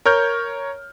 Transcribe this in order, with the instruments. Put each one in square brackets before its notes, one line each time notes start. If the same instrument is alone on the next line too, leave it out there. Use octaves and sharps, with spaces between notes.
[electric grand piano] A#4 C#5 F6 G6